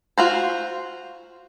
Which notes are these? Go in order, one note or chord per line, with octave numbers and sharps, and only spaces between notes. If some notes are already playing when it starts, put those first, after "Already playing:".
F4 F#4 C5